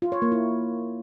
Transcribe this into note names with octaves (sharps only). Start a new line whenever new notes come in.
F4
C#5
A#3
E4